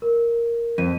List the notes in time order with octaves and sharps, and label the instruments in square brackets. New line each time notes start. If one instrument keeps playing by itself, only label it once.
[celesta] A#4
[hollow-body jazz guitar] F2 [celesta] D#7